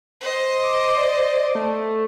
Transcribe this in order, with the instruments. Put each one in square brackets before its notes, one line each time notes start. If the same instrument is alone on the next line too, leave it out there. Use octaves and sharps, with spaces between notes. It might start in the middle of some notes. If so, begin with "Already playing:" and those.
[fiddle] C5 D#5
[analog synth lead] D6
D5
A3